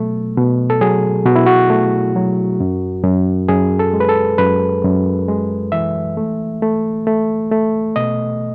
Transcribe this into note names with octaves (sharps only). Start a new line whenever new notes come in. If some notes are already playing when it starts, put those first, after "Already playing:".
Already playing: B2 F#3 A3
B2
A4
F#3 G#4
B2 F#4
E4
F#4
A3
F#3
F#2
F#2
F#2 G#4
A4
G#3
B4
A4
F#2 B4
F#2
G#3
E3 E5
A3
A3
A3
A3
B2 D#5